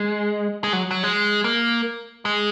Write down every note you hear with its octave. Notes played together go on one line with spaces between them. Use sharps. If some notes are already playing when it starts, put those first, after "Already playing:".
Already playing: G#3
G#3
F#3
F#3
G#3
A#3
G#3